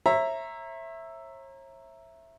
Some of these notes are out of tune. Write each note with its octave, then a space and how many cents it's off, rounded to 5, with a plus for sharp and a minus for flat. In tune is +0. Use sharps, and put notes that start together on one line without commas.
C#5 -40 E5 +0 A#5 -5